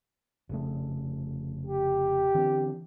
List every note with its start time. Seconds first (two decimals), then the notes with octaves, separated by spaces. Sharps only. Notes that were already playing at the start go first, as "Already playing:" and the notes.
0.49 F1 C#3 A3
1.67 G4
2.34 D3 E3 C4